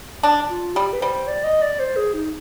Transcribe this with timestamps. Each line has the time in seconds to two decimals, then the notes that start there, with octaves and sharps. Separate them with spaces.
0.23 D4
0.50 F4
0.75 G3 G4
0.93 B4
1.01 G3 C5
1.28 D5
1.45 D#5
1.63 D5
1.80 C5
1.96 G#4
2.14 D#4